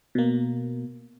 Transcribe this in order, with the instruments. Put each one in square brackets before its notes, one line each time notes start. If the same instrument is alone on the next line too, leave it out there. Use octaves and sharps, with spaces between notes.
[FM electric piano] B2 A#3